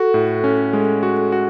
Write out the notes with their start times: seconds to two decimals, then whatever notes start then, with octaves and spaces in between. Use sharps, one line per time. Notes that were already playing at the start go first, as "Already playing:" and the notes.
Already playing: F#4 A4
0.14 A2
0.44 C#4
0.73 G#3
1.03 F#4
1.32 F#4